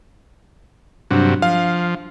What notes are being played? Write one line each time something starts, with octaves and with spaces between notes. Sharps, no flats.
G2 C3 F#3 D4
F3 F5